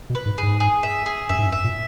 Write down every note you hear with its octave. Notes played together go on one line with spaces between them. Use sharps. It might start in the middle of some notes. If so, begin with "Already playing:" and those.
B2
B4
G#2
G#2 G#4
G#4
E5
G#4
F#2 E5
G#2
F#2
E5
A#2